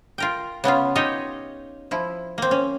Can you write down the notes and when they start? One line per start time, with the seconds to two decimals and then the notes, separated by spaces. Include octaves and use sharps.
0.18 F4 A#4 G5
0.64 C#3 B3 C#4 F4
0.95 D#4 F4 G4 C#5 D#5
1.91 F3 E4
2.38 A#3 C4
2.51 C#4